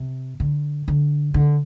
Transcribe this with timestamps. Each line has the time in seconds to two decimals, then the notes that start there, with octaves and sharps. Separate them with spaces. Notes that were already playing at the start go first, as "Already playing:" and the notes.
Already playing: C3
0.40 D3
0.88 D3
1.34 D3